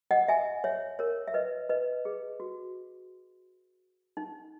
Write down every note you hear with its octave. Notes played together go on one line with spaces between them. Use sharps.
D#5 F#5
E5 G#5
C#5 E5
A#4 C#5
E5
B4 D#5
B4 D#5
G#4
F#4
D#4